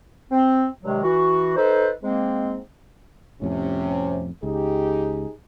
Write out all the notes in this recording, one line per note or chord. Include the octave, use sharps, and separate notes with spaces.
C4
G2 C3 D#3 F#3 G#3
E3 F#4
D#4 A4 B4 C5
G#2 G#3 A#3 C4
F2 A2 C3 C#4
C#2 D#4 G4 G#4